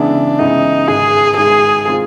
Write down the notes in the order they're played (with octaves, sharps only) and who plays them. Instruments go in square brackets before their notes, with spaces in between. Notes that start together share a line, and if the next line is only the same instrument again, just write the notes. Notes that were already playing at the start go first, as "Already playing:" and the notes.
Already playing: [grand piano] C#3 E3 G#3 B3 E4 [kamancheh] D4
[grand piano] C#3 E3 G#3 B3 E4 [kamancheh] D#4
[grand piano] G#2 D#3 G#3 [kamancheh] G#4
[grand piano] G#2 D#3 G#3 [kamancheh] G#4
[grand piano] D#3 G#3 C4 F4